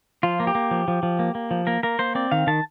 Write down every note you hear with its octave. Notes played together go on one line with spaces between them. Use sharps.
F3 F4
A#3
G4
A#3
F3
F3
F3
A#3
A#3
F3
A#3 A#4
A#3 A#4
A#3 C5
C4 D5
D#3 F5
D#3 A5